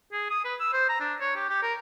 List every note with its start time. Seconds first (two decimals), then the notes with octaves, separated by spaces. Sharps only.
0.12 G#4
0.30 D#6
0.45 B4
0.60 E6
0.73 C5
0.89 A#5
1.00 D4
1.21 C#5
1.36 G4
1.50 G4
1.63 A#4